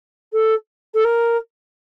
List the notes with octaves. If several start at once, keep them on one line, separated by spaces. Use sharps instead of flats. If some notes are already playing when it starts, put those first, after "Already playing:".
A4
A4
A#4